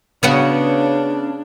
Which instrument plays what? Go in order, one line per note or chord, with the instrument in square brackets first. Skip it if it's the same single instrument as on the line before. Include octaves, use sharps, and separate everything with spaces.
[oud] C#3 B3 F#4 [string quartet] D4